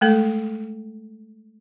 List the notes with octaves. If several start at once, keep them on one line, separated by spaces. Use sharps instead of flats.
G#3 A3 A4